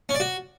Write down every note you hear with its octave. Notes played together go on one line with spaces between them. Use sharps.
C#4
D5
F#4